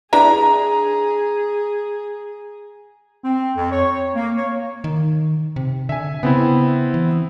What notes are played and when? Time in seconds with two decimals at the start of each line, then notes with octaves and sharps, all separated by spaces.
0.13 D4 E4 G#4 B4 A#5
3.24 C4
3.55 F2
3.72 C#5
4.15 A#3
4.37 C#5
4.84 D#3
5.56 C3
5.89 D3 E5 G#5
6.23 C#3 B3 C4 E4
6.94 E3